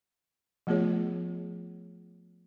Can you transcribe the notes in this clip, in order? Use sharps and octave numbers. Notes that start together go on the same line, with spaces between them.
F3 A3 B3 F4 G#4 C#5